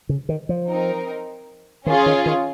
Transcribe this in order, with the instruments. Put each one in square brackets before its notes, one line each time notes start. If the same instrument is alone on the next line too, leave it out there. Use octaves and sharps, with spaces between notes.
[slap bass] C#3
D#3
F3
[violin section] C4 D#4 A#4
[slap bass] D#3 [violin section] C#4 F4 G#4
[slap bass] D#3
D#3